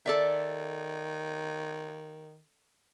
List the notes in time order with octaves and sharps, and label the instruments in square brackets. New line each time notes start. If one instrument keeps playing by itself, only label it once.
[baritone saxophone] D#3 [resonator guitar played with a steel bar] A4 D5 E5